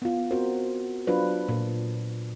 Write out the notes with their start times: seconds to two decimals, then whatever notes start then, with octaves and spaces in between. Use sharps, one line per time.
0.02 B3 F4
0.31 C4 F#4 A#4 C5
1.07 F#3 D4 F4 B4 C5
1.49 A#2